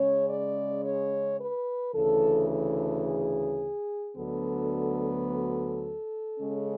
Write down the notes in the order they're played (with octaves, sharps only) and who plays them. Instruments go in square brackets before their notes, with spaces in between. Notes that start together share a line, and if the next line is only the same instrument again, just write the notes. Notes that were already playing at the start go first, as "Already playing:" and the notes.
Already playing: [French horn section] C#3 G#3 C#4 C#5
D5
C#5
B4
D2 C#3 E3 A4
A4
G#4
D2 D3 F#3 B3 A4
A4
C#3 G#3 C#4